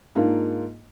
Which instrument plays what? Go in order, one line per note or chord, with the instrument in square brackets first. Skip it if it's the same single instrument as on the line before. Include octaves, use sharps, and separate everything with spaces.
[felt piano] G#2 A#3 D4 F4